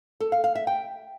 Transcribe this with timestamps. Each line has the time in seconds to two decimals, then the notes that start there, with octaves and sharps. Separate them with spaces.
0.20 A4
0.32 F5
0.44 F5
0.55 E5
0.67 G5